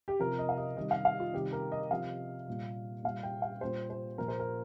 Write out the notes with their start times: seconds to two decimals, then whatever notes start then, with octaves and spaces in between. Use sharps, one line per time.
0.08 G4
0.19 C3 F3 A#4
0.39 D#5
0.49 F5
0.58 D#5
0.77 C3 D#3 G3 D#5
0.91 F5
1.05 F5
1.20 F4
1.34 C3 D#3 G3 G4
1.53 A#4
1.72 D#5
1.90 C3 F3 F5
2.48 A#2 G3
3.04 A#2 G3 F5
3.23 G5
3.42 F5
3.61 A#2 G3 C5
3.90 C5
4.18 A#2 F3 A#4
4.28 C5
4.39 A#4